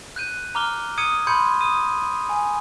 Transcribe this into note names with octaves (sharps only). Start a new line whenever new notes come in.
F#6 G6 D#7
A#5 D6 F6 G7
D#6 G#6 C#7 D#7
B5 C6 G6 G#6 C#7
D#6 D#7
G#5